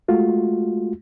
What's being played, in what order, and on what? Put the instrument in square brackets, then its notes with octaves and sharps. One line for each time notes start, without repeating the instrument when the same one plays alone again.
[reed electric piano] G#3 A3 F4 F#4